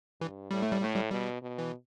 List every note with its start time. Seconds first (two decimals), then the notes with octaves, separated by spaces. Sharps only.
0.20 G2 E3
0.51 A2 G3
0.62 A3
0.72 G3
0.81 A2 A3
0.95 G3
1.11 B2 G3
1.42 B2
1.59 E3